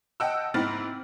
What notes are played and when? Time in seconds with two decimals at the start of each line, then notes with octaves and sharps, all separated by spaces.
0.20 D#5 F#5 G5 A5 E6
0.54 G#2 C4 E4 F6 A6